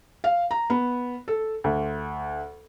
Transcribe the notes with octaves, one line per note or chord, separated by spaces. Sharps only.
F5
A#5
B3
A4
D2